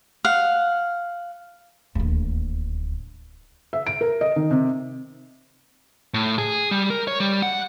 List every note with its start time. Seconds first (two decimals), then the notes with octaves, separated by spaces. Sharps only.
0.25 F5 F#5
1.95 D1 D#2
3.73 E5
3.87 D7
4.01 A#4
4.21 D#5
4.36 D#3
4.51 C3
6.14 A2
6.38 G#4
6.71 G3
6.90 A#4
7.08 C#5
7.20 G3
7.42 F#5